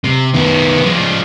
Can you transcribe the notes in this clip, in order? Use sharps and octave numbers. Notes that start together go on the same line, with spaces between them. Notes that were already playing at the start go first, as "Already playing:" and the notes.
C3
D#3 B3
F3 G#3